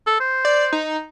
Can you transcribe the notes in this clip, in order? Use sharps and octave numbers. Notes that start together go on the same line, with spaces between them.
A4
C5
D5
D#4